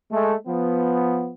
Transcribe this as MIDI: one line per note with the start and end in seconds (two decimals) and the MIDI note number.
0.12 0.35 56
0.12 0.35 57
0.47 1.33 53
0.47 1.33 59